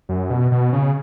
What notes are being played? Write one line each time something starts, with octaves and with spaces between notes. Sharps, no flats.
F#2
B2
B2
C#3